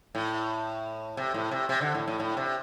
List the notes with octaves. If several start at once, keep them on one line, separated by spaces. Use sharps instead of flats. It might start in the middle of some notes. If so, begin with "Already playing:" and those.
A2
C3
A2
C3
C3
D3
A2
A2
A2
C3